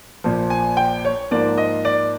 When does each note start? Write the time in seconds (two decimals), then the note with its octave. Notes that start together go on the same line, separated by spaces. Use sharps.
0.24 A#1 A#2 F3
0.50 G#5
0.77 G5
1.05 C#5
1.31 G#2 F3 A#3 D5
1.58 D#5
1.85 D5